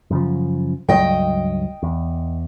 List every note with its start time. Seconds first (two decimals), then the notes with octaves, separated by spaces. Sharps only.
0.11 F#2 C#3 F3
0.89 C#2 G2 F#3 D#5 G5
1.83 E2